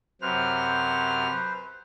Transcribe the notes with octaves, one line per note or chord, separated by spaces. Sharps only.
F#2 C3 B4 C5 F6